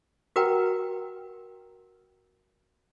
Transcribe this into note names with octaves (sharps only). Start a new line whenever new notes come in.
F#4 A#4 B4 F#5 G5 A#5